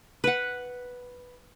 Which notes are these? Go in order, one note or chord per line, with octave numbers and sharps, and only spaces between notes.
B4 F#5